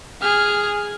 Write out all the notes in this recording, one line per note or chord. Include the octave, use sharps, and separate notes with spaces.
G#4 F6